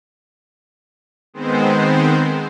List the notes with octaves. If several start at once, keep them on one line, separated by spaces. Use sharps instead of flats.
D#3 G#3 B3 C4 C5